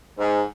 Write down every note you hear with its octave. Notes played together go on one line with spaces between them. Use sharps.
G#2